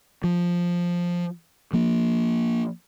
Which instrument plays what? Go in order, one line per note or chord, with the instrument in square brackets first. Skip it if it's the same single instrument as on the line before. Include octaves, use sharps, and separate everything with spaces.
[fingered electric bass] F3
F3 A#3